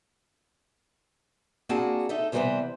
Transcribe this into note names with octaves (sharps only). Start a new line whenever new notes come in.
A#3 C4 D4 F#4 G#4 A5
D#4 A4 E5
C3 E3 G3 B3 B4 C5